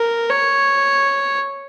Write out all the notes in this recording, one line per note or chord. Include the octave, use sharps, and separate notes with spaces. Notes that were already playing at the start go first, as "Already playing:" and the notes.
Already playing: A#4
C#5